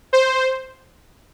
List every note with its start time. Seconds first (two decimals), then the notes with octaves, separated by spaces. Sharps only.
0.13 C5